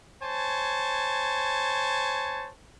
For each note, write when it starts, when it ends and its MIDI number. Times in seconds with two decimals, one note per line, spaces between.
0.23 2.50 72
0.23 2.50 73
0.23 2.50 80
0.23 2.50 81